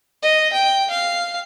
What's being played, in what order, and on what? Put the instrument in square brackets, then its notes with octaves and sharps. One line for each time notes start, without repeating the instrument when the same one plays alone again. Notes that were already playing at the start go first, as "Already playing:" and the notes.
[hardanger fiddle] D#5
G5
F5